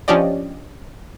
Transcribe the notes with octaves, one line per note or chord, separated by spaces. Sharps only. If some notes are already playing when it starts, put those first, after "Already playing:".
F3 C#4 D4 G4 D5 D#5